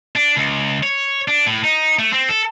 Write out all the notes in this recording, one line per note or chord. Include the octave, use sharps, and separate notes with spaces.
D4
C#2
C#5
D4
A2
D#4
A3
C4
A4